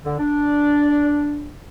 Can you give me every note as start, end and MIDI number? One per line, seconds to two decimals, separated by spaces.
0.04 0.14 50
0.19 1.48 62